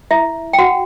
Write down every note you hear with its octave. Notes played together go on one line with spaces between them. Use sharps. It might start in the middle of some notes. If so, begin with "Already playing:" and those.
E4 E5
G5
F#4 F#5